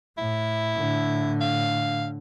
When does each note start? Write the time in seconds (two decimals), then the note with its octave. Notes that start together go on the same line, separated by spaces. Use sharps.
0.18 A2 E4
0.76 A2 D3
1.40 F5